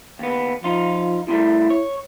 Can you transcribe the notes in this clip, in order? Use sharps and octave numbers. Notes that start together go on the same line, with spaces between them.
D#2 B3
F3 D#4 F4
C3 G3 A3 E4
C#5